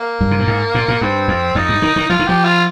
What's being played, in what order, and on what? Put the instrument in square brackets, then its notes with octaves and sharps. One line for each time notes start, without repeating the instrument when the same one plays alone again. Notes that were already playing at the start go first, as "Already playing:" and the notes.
Already playing: [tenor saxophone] A#3
[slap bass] G2
C3
A#2
G#2
A#2
A#2
[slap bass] G2 [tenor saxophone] C4
[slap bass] F2
[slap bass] F2 [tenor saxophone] D#4
[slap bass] G2
D#3
D#3
[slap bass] F3 [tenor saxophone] F4
[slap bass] D#3
[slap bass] F3 [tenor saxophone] G4
[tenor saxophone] F4